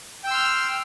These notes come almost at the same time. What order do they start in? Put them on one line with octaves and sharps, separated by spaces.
G5 E6 C6 F6